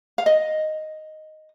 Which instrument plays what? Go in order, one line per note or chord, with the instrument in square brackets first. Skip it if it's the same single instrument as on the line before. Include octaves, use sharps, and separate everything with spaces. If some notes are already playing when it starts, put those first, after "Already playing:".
[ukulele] F5
D#5